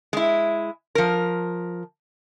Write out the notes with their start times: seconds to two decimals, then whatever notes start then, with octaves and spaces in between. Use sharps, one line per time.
0.13 G#3 E4
0.95 F3 A#4